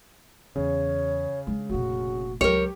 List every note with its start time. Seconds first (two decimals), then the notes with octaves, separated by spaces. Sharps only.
0.56 E2 C#3 C#5
1.47 G#3 D4
1.69 F1 A#2 F#4
2.41 C#2 F#3 G4 A#4 C#5